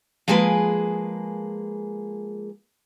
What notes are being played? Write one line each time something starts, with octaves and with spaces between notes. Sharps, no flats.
F3 G#3 A#3 G#4 B4